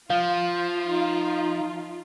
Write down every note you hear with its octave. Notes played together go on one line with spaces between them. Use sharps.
F3 F4 F5
D#4